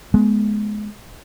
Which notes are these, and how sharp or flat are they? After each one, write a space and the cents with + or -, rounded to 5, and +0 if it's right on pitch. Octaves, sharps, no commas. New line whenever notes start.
G#3 +20 B3 -15